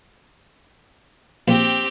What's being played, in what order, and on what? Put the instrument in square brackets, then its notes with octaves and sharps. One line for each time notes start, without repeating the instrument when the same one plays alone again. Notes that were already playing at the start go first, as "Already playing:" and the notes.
[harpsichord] A#1 [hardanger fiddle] C4 G4